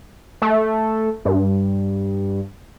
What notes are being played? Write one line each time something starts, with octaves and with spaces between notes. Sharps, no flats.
A3
G2